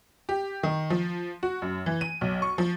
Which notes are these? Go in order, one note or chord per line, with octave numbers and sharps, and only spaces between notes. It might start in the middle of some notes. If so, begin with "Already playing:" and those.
G4
D#3
F3
F#4
F#2
E3
D#7
B1
C#6
F3